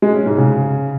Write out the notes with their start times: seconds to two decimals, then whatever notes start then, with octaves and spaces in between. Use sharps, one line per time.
0.02 G#3
0.14 C#4
0.26 G#2
0.38 C#3